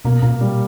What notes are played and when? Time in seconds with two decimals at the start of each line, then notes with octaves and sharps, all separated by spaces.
0.05 B2 A#3
0.22 A#2 A#3
0.41 G3